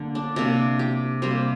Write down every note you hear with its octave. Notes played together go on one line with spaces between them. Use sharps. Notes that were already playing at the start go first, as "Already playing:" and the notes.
Already playing: D3 A#3
D4
C3 A#3 D4
G4
C3 G3 A#3 C5